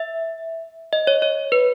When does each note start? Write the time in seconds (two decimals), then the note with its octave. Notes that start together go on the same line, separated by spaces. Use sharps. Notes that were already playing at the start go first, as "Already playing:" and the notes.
Already playing: E5
0.93 D#5
1.07 C#5
1.22 C#5
1.52 B4